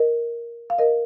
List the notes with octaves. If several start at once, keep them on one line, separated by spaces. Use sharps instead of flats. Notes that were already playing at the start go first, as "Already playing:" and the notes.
Already playing: A#4 D#5
F5
A#4 D#5